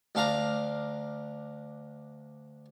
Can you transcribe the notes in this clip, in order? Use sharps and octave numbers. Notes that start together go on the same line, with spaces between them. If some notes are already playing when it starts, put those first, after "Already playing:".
D2 D4 F5 A#5